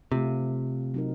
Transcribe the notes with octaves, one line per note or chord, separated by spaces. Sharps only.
C3 A3 C4 F4
F#3 C4 D#4 A#4